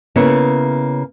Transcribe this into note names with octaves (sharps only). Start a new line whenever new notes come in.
C#3 A#3 B3 E4 C#5